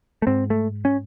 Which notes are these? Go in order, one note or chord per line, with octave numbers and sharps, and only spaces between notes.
A3
G#2 C4
A3
C#4